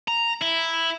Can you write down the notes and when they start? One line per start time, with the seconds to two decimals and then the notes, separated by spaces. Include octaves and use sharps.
0.08 A#5
0.41 E4